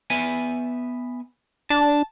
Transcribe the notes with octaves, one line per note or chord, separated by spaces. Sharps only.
B3 E5 G#5
D4 A5